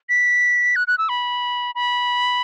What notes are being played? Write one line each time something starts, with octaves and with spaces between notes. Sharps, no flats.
B6
F#6
F#6
E6
B5
B5